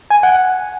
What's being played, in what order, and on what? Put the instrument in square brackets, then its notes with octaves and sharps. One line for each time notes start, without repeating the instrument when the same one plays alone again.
[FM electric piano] G#5
F#5